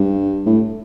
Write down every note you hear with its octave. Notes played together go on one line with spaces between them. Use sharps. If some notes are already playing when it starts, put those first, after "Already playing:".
Already playing: G2
A2